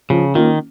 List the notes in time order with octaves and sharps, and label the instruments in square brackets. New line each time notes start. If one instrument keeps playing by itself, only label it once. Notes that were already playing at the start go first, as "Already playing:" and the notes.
[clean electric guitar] C#3 [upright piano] F3
[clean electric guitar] D#3 [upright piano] A#3 C#4 F4